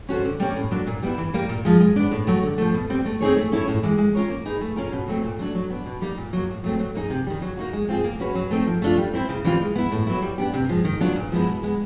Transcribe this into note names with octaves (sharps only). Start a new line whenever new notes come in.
C#4 F#4 A4 C5
D3
G3 A#3 C#4
A2
F#3 A#3 D4
A#2
G3 B3 E4
E3
G3 A#3
A#2
F3 G#3
G#3
B3 D4
A2
F#3 A3
D3
F3 A3
B2
G3 C4
A3
C4 D#4 G#4 C#5
A3
C#4 E4 A4 C#5
A2
E3 G#3
G#3
C#4 F4 A#4 C#5
A#3
D#4 G#4 B4
A3
C#4 F4 A#4
B2
F#3 A3 C4
A#2
F#3 A3 D4
F#3
B3 D4
B2
G3 A#3 D#4
A#2
F#3 A#3
A2
F#3 A3 C4
F#3
A#3 D#4 G#4
C3
D#3 G3
F#3
A#3 D#4 F#4
G#3
C4 F4 G#4
A#3
C#4 F#4 B4
F#3
A3 C4 D#4
F3
A3 D4 F4
G3
C4 E4 A4 C5
C#3
E3 G3 C4 F4
G#3
B3 E4
A2
F#3 B3 E4
G3
B3 D4 G4
C3
F3 G#3
D#3
F#3 B3 D4 F4
A#2
F3 G#3 B3 E4
B2
G#3 B3